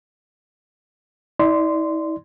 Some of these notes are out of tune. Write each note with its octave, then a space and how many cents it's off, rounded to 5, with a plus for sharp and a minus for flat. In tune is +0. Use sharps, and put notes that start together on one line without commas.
E4 -45 D5 +0 C6 -15